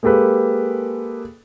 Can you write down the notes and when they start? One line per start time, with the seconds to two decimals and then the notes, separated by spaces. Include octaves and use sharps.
0.03 G#3 A#3 G4 A4 B4